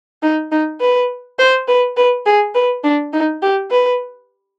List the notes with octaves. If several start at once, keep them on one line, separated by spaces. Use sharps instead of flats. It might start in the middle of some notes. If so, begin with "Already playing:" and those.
D#4
D#4
B4
C5
B4
B4
G#4
B4
D4
D#4
G4
B4